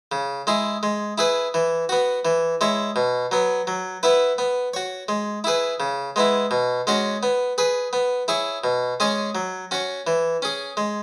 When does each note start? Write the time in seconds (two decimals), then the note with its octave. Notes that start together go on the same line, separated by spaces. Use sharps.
0.12 C#3
0.47 G#3 E4 G#4
0.83 G#3
1.18 E4 G#4 B4
1.54 E3
1.89 B3 F#4
2.25 E3
2.61 G#3 E4 C#5
2.96 B2
3.32 F#3 B3
3.67 F#3
4.03 B3 E4 B4
4.38 B3
4.74 F#4 C#5
5.08 G#3
5.44 E4 G#4 B4
5.80 C#3
6.16 G#3 B3 E4
6.51 B2
6.87 G#3 C#4 F#4 C#5
7.23 B3
7.58 G#4 B4
7.93 B3
8.28 E4 G#4 C#5
8.64 B2
9.00 G#3 C#4 G#4 C#5
9.35 F#3
9.71 C#4 F#4 C#5
10.07 E3
10.42 C#4 G#4
10.77 G#3